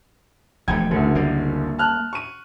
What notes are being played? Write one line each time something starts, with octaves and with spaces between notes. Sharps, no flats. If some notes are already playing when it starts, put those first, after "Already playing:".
E1 F3 A3 G5 G#6
F#1 D2 A3
G3 A#3
A5 F6 F#6
C#6 D#7